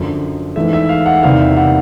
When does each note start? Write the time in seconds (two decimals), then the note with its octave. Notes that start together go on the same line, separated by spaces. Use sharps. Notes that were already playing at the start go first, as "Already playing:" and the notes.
Already playing: F#2 D3 F3
0.56 G#2 E3 A3 E5
0.73 E5
0.89 F5
1.06 F#5
1.23 E2 C3 D#3 G3 A#3 F5
1.40 E5
1.56 F#5